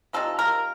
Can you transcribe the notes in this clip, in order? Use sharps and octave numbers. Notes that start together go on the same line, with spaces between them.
C3 F3 A#3 D#4 A4
A#4